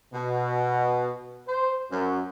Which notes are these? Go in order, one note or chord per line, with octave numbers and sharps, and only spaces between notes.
B2
C5
F#2